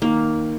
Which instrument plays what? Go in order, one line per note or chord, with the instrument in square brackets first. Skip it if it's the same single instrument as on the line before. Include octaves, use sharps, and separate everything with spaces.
[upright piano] D#3 [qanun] A#3